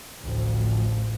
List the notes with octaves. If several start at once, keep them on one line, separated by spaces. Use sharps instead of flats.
A1 D2 A2 F3